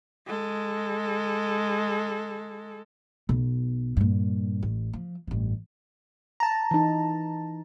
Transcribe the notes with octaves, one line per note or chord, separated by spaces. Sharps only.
G#3 A4
B1 B2
G2 A#2
A1
F3
A1 G2
A5 A#5
E3 D#4